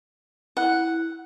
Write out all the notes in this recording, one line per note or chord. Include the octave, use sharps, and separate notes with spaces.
E4 F#5